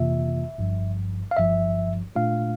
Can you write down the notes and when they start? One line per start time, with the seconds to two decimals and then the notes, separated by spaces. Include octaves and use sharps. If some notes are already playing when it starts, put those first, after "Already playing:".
Already playing: F2 C3 E3 A#3 F4 E5
0.58 G1 G2 F3
1.31 F5
1.37 G1 G2 F3 E5
2.16 A#2 A3 D4 F4 F5